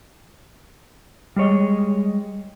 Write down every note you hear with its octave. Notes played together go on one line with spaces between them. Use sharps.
G3 G#3 C#5 D#5